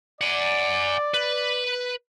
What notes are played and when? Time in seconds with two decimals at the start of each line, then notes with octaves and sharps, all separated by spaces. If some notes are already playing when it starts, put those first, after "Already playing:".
0.21 D5 F#5 G#5
1.14 B4